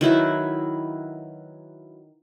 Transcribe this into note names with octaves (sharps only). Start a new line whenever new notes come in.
D#3 F#3 E4 B4